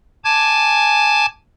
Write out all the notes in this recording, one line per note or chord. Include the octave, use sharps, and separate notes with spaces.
G#5 A5 D6 G#6